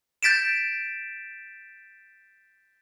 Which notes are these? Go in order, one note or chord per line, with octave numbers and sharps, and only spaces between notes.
G6 A6 B6 D7 E7